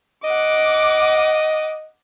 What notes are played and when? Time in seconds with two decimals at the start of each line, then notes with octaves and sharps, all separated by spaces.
0.24 D#5 F#5 D6